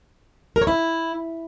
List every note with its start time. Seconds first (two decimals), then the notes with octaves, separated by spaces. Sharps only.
0.56 A#4
0.62 C#5
0.67 E4